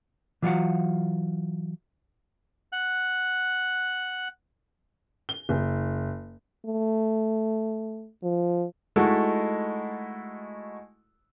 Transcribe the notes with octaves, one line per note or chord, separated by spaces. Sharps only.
E3 F#3 F4 C#5 F5 F#5
F#5 F#6
G7
F#1
A3
F3
G#3 A3 D#4 E4 F#4 A4